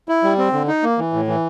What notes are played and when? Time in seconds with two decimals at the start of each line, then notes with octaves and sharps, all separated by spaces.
0.09 E4
0.24 G3
0.38 C4
0.53 D3
0.68 D#4
0.83 A#3
0.98 E3
1.13 A2
1.28 E3